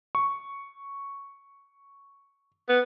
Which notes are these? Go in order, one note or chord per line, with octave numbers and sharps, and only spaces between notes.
C#6
B3